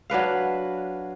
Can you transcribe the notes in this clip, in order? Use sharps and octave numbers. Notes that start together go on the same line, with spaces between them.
F#3 D4 B4 F5